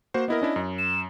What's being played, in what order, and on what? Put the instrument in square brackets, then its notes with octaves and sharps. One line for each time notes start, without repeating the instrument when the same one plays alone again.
[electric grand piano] A#3 F#4 C5
[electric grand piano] B3 E4 A#4 [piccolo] D#5
[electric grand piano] C#4 D4 E4
F#2
[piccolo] E7